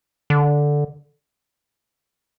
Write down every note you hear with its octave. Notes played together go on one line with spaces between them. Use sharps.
D3